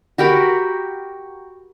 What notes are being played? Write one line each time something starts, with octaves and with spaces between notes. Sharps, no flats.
F#4 G4 A#4 B5